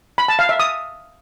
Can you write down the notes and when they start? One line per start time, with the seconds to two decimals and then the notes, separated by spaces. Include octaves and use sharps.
0.18 B5
0.28 A5
0.39 F5
0.49 E5
0.60 D#6